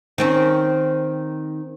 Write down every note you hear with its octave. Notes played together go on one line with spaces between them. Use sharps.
D#3 C4 C#4